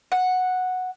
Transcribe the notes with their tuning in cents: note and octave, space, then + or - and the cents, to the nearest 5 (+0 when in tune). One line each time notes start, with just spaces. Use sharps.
F#5 -5